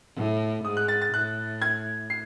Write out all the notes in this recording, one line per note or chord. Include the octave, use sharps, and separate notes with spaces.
A2
G#2 D#6
F#6
A6
A6
A2 F#6
G#6
C7